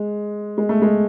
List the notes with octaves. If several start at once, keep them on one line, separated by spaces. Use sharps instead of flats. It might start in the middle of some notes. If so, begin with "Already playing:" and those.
Already playing: G#3
G#3
A3
G#3